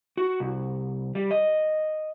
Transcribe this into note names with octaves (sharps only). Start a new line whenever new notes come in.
F#4
C2
G3
D#5